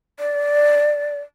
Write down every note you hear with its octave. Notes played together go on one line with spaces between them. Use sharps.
D5